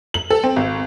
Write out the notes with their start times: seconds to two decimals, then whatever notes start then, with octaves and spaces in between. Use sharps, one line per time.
0.14 F#7
0.30 A4
0.44 C4
0.56 G#1